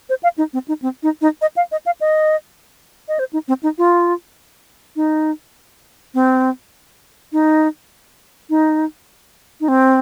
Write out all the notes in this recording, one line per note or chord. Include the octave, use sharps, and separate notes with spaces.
C5
F5
D#4
C4
D#4
C4
D#4
D#4
D#5
F5
D#5
F5
D#5
D#5
C5
D#4
C4
D#4
F4
D#4
C4
D#4
D#4
D#4
C4